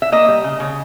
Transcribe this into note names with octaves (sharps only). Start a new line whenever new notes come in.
E5
A#3 D#5
G3
C#3
C#3